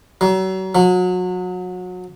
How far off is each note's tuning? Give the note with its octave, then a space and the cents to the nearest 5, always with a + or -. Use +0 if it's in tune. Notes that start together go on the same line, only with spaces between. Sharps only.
F#3 +35
F#3 -30